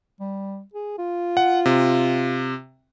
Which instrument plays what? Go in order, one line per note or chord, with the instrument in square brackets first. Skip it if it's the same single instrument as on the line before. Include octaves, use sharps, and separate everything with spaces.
[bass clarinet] G3
G#4
F4
[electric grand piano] F#5
C3